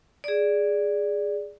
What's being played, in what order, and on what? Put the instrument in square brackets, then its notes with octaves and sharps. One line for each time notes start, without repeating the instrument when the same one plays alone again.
[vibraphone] G#4 D5